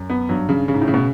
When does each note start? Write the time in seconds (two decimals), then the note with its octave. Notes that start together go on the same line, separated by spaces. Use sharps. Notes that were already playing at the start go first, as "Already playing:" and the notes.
Already playing: F#2
0.10 B3
0.29 G2 F#3
0.49 C#3
0.68 C#3
0.74 G#2
0.81 A2
0.88 C#3
0.94 B2